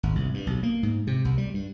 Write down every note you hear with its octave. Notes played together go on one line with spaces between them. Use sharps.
G#1
C2
G2
B1
A#3
G#2
C3
C2
G3
G2